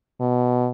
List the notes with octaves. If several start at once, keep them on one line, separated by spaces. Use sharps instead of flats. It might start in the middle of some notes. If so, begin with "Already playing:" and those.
B2